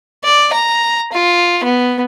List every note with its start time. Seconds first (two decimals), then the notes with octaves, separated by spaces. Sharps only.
0.24 D5
0.53 A#5
1.13 F4
1.64 B3